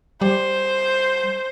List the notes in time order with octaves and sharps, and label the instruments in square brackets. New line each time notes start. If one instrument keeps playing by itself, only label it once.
[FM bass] G3 [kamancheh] C5